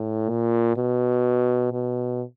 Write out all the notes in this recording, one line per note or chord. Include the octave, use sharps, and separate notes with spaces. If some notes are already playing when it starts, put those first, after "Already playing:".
Already playing: A2
A#2
B2
B2